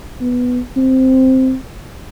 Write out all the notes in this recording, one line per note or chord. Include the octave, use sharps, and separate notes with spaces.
B3
C4